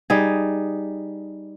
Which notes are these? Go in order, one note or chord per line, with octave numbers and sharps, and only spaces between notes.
G3 D#4 G#4